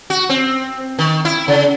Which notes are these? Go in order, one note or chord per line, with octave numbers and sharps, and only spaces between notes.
F#4
C4
D#3
E4
C#3